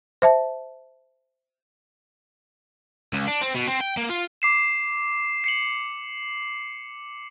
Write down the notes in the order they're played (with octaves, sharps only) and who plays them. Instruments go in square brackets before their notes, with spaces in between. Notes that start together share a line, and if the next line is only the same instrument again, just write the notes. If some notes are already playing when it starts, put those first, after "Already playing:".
[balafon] C5 E5 A5
[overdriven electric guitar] C#2
D4
C4
B2
C4
G5
A#3
F4
[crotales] D6 C7 E7
C7 C#7 F#7